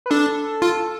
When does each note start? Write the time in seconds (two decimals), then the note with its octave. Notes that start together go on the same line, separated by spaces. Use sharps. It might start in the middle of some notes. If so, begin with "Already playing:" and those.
0.06 B4
0.10 D4 A4
0.62 F4